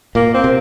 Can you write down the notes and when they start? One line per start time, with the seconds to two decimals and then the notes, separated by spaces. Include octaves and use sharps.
0.15 A#2 A#3
0.34 C4
0.44 C3